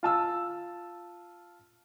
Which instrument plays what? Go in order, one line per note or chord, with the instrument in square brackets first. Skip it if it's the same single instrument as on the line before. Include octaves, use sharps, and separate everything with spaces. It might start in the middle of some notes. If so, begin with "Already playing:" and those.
[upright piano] F4 A5 E6